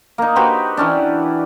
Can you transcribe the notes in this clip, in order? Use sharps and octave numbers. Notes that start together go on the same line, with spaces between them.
A#3 D#4
F#4 G4 B4 C5
E3 C#4 D4